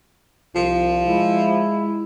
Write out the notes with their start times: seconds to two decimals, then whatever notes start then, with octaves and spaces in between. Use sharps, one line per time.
0.56 C2 F3
1.07 G#3 E4